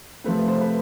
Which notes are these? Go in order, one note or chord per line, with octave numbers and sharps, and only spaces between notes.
C3 F3 A3 C4 B4
C5
B4